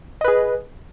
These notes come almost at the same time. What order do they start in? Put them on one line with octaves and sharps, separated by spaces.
D#5 B4 G#4